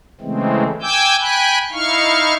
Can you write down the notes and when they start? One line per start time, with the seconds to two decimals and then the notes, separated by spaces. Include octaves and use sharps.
0.21 C#3 E3 G#3 A3 C4
0.82 G5 G#5 D6 E6 G6
1.20 G5 G#5 B5 F#6
1.72 D#4 E4 F5 C#6 F6